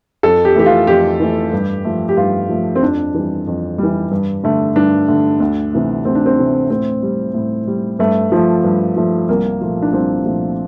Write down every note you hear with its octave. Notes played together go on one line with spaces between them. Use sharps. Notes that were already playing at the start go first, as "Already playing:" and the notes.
F2 A4
G4
E3 A3 G4
F4
F2 G4
E3 A3
G2
F3 A3
G4
G2 F4
F3 A3
C4
F2 D4
E3 G3
F2
E3 G3
G2
D3 A3
G2 D4
D3 A3
D2
C3 E3 A3
D2 C4
D4
C4
C3 E3 A3
A2 C4
G3
A2
G3
G2 A3
F3 A3
G2
F3 A3
C2 A#3
A#2 F3 A3
D4
C2 C4
A#2 F3 A3